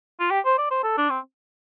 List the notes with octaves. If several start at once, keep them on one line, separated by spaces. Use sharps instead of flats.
F4
G4
C5
D5
C5
A4
D4
C4